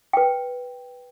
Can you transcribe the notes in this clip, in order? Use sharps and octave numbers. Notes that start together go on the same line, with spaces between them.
B4 G5